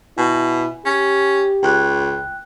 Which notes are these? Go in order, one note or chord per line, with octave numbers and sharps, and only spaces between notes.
B2 E4 G#5
C#4 G4
C#2 G5 F#6